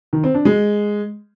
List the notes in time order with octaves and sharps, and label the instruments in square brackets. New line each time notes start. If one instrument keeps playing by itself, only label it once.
[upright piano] D#3
C4
D4
G#3